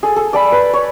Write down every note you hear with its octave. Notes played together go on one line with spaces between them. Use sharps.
G#4 A4
A4
D5 A5 B5
B4 B5
C#5